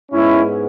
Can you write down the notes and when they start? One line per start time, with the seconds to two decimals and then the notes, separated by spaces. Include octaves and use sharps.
0.11 G#2 G#3 B3 C#4 E4